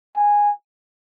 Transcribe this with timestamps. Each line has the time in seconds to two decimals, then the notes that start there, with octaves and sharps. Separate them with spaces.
0.16 G#5